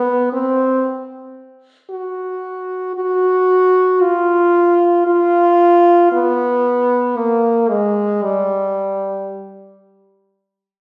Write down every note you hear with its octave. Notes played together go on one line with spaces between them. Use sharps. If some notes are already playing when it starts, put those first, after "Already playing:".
Already playing: B3
C4
F#4
F#4
F4
F4
B3
A#3
G#3
G3